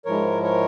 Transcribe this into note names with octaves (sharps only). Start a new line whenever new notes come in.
G#2 F3 G#3 E4 A#4 C#5
A#4 C#5